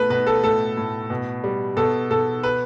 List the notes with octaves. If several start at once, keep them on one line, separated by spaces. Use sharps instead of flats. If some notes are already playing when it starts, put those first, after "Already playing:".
Already playing: B2 A3 B4
B2 B4
A4
A2 A4
A2
B2
G3
B2 A4
B2 A4
B4